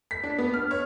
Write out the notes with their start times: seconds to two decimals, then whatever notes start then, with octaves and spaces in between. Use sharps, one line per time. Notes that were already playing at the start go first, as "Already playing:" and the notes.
0.11 B6
0.23 D4
0.39 B3
0.54 F6
0.71 C#5